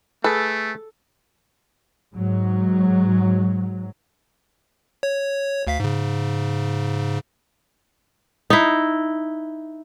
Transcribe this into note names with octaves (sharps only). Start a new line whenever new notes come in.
A3 G#4 A4 B4
G#2 F#3
C#5
D2 F5 B6
G#2 C#3
D#4 E4